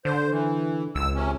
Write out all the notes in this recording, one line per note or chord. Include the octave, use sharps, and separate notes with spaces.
D3 C5
E3
C#2 E6
C3 C#4